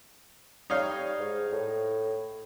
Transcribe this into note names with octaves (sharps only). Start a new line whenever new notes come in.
G3 D#4 C#5 F5
G#2
A2